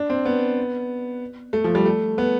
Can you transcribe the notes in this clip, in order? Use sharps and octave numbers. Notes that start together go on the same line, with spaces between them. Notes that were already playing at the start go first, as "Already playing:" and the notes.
Already playing: D4
C4
B3
A3
F3
G3
A3
B3